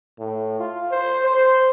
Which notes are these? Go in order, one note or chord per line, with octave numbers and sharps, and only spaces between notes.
A2
F4
C5
C5